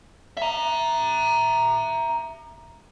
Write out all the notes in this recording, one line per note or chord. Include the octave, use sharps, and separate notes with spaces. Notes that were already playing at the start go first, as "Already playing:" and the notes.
E5 A#5